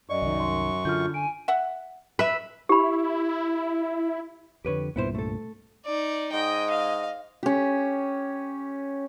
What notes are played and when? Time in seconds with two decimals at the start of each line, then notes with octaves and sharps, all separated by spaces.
0.09 F#2 D5 D#5 C#6
0.22 C2 D#3
0.40 C6
0.85 D3 F4 F6 G6
1.14 G#5 D7
1.48 E5 F#5
2.19 B4 E5 B5
2.69 E4 G4 B5
4.65 F2 D3 G4 B4 C#5
4.96 C2 G2 A#2 B3 E4 C5
5.15 A3 A4
5.85 D#4 D5
6.32 G#2 G#3 D#5 G5
6.70 F5
7.43 C#4 G4